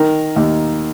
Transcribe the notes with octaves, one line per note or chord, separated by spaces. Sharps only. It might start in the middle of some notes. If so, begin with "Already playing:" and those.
Already playing: D#3 A#4
D#2